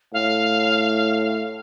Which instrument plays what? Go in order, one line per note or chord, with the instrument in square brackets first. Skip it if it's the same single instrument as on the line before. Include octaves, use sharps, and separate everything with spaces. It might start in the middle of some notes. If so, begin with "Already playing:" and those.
[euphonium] A2 [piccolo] F5